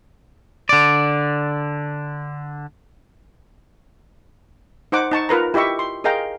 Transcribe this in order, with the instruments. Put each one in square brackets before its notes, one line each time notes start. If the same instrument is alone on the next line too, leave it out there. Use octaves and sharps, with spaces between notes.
[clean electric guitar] D3 D5
[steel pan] D#4 C5 F#5 D6
D#4 A5 C#6
F4 A#4 B4 A#5
E4 G4 D#5 E5 C#6
C6
G#4 A#4 D#5 F5 G5 A#5